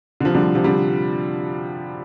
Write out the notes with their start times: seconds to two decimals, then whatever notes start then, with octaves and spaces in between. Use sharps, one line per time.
0.21 D3
0.25 C3 F3
0.35 D3 G3
0.55 C3 F3
0.64 D3 G3